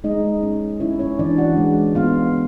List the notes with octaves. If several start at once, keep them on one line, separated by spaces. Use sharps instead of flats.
G#3 D#4 D#5
C#4
C#4 E4 C#5
C#4 C#5
E3 D4 D5
F#4 F#5
G#3
B3 F4 F5